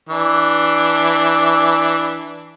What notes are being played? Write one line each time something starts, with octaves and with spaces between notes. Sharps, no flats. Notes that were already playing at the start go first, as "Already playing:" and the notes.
E3 D4